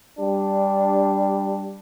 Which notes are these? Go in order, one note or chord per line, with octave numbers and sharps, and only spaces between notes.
G3 D4